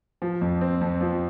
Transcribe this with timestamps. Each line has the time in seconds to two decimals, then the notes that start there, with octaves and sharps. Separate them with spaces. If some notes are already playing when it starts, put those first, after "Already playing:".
0.22 F3
0.41 F2
0.61 C4
0.81 F2
1.01 F3